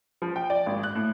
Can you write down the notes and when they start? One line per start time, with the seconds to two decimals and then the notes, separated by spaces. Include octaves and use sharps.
0.22 F3
0.36 G5
0.50 D5
0.66 G#1
0.83 F#6
0.95 A2